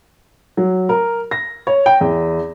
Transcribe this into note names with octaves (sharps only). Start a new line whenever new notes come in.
F#3
A#4
A#6
C#5
G5
E2